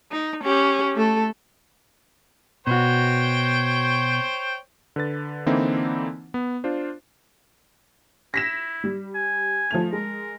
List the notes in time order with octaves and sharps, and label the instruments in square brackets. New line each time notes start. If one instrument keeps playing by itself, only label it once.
[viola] D#4
C#4 G4
A3 A4
[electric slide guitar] B2 F#4 [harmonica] C5 C#5 G5
[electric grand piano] D3 B4 A6
D3 E3 A#3 C4 D#4 E4
B3
D4 F4 C5
[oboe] E4 [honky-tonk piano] A#6 B6 E7
[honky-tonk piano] G3
[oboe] G#5
[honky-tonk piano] F3 A3 F7
[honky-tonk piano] G#3 [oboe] A#4